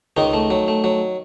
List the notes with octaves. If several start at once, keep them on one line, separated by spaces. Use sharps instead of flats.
C#2 D#3 D#4
A3
F#3
A3
F#3